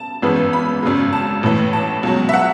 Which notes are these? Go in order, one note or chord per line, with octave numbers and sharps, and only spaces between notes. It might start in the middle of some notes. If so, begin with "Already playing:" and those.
Already playing: A5
G#1 F#2 E3 G#3 B3
B5
G#1 F#2 C#3 G#3
A5
A1 A2 E3
A5
C#2 B2 F#3
E5
F#5